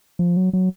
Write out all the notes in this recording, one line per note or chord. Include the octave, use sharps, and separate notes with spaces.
F3
F#3
F#3